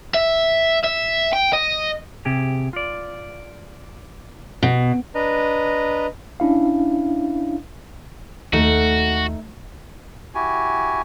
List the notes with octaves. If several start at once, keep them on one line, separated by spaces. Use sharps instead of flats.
E5
E5
G5
D#5
C3 G4 G#4
F4 D5
B2
D4 B4 D#5 A#5
C#4 D4 E4 F5
D#2 A3 D#4 F#4
E4 F#4 G4 G#5